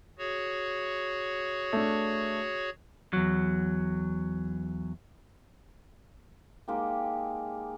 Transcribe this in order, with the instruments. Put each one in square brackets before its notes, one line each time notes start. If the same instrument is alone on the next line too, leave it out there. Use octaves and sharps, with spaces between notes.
[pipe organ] F#4 G#4 C#5
[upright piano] A3 D4
[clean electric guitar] E2 F#3
[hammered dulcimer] G#3 A#3 D#4 G4